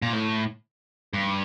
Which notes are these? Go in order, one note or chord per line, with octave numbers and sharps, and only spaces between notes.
A#2
A2
G2